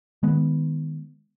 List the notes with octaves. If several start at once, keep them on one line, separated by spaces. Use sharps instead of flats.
D#3 G#3 B3